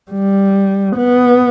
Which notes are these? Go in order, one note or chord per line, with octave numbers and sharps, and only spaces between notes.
G3
B3